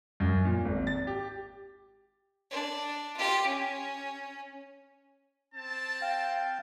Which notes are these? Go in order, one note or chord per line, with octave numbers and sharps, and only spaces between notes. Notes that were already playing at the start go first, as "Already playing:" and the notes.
F#2
A#2
G#1
A6
G4
D4
F4 G4
C#4
C4 A5
F5 G5